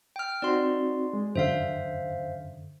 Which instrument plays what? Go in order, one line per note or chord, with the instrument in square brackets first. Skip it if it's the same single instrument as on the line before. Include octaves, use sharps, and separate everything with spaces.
[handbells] G5 F6
[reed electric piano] C4 D#4 F#4 [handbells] D5 C6
[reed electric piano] G#3
[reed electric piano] F#2 D3 [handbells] C5 E5 F5